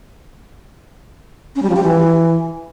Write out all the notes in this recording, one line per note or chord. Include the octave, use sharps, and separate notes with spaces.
C#4
G3
F3
G4
E3